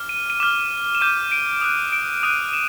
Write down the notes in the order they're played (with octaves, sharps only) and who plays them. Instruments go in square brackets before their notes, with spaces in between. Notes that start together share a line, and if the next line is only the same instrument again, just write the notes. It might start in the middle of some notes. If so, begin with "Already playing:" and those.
Already playing: [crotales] D6 F6
D#7
D#7
D6 F6 E7
E7
D6 G6 D#7
D7
D#6 F#6
D7
D#6 F#6 D#7
E7